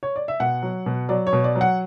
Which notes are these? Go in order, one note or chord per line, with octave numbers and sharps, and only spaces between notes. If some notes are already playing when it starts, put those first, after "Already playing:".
C#5
D5
E5
B2 F#5
F#3
B2
F#3 D5
C#5
B2
D5
F#3
F#5